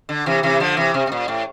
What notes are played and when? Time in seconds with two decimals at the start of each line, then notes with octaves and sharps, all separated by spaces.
0.09 D3
0.26 C3 E3
0.43 C3 E3
0.60 D3 F3
0.77 C3 E3
0.94 C3
1.07 C3
1.12 A#2
1.28 A2